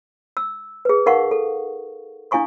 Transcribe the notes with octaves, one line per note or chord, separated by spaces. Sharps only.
E6
G#4 B4
D#4 A#4 F5 F#5 C#6
A4
D4 E4 F5 G#5 C#6 D#6